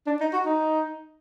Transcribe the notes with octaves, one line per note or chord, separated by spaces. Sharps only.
D4
D#4
F#4
D#4